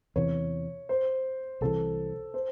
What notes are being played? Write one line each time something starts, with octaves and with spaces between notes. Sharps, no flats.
E2 C3 E3 C#5
C5
C2 C3 E3 A4
C5